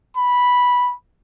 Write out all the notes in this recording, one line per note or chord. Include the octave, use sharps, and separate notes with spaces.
B5